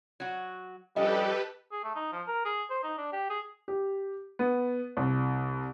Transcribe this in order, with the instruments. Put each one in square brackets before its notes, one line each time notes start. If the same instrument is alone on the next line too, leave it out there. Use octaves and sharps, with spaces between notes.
[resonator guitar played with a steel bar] F#3 F#4
[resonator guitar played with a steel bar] F3 C#4 D4 [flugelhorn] G3 [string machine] G4 A4 B4 [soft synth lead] D#5
[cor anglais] G#4
A3
D#4
F3
A#4
G#4
C5
D#4
D4
G4
G#4
[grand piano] G4
B3
C2